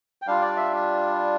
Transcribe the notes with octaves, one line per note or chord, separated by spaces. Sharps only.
G5
G3 D4 F4 F5
D5
E5